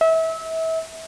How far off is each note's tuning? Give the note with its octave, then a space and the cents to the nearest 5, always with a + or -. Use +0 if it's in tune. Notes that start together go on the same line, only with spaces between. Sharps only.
E5 -30